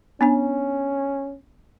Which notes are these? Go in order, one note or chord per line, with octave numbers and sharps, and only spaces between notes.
B3 C#4 D4 G#5